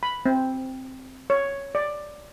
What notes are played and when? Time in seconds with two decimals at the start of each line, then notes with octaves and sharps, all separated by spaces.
0.03 B5
0.26 C4
1.30 C#5
1.75 D5